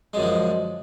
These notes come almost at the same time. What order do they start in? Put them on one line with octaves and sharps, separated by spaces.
G#3 F#2 D3 F3